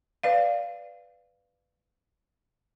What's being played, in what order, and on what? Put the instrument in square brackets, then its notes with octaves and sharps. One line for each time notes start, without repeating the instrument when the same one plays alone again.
[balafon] B4 D5 F5